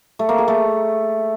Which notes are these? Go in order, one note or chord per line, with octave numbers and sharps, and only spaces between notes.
A3
A#3
G#4
A3